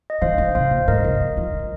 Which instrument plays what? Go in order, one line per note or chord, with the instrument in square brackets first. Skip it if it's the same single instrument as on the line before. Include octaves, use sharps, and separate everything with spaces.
[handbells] D#5
[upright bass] D#3 [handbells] C5 F5
[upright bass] D#3
[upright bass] C3 [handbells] C5 F5
[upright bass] A#2
[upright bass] G#2 [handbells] A#4 D#5
[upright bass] C3
D#3
F3
D#3